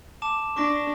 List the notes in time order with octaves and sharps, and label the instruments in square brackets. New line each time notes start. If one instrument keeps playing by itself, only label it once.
[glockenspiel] A5 D6 E7
[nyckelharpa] D4 [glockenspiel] C#6 D6 A#6